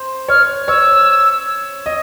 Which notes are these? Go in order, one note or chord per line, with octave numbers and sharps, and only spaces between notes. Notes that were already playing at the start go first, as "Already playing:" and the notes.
Already playing: C5
C#5 F6
C#5 E6
D#5